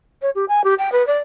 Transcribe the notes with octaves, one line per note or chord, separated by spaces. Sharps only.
C#5
G4
G#5
G4
G5
B4
D5